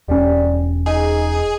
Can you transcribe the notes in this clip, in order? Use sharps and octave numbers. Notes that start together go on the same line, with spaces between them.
E1 G3 C#4
D#4 G#4